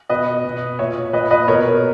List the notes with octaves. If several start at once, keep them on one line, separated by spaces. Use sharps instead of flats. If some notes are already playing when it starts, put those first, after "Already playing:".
B2 B4 D#5
B2
A#2 C#5 E5
A#2 B4 D#5
B4 D#5
B2 A#4 C#5